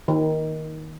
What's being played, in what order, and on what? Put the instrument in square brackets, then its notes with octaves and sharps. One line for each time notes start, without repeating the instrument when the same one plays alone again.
[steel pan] D#3